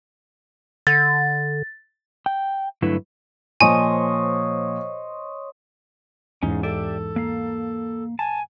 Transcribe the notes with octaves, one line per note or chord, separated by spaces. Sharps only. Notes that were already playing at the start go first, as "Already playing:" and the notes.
D3 A6
G5
G2 D3 F#3 A3 E4 B4
A#2 F3 C5 C#5 D#5 G#5
E2 G#2 C#4 D#4
G4 A4 D5 E5
A#3 F5
G#5 A5